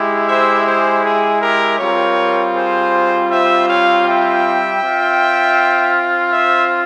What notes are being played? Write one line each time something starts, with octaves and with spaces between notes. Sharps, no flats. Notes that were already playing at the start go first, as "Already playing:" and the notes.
Already playing: G#3 E4 G4
C5 E5
G#4 C5
G#4
G4 A#4
G3 C4 F4 A#4 C#5
G#4 C5
C5 E5
C#5 F5
E5 G5
C4 F4
C5 E5